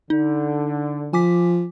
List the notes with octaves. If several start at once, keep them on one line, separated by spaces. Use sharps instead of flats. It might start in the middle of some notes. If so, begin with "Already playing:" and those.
D3 D#4
F3 G#5 D6 B6